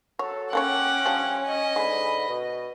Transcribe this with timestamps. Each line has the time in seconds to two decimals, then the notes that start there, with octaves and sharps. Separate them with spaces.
0.19 F#3 A4 C#5
0.53 A#3 C#4 A4 C#5 F#5 G5 D6
1.06 F3 G3 D4
1.47 D#5
1.76 G#2 D3 G#3 B5
2.28 B2 D#5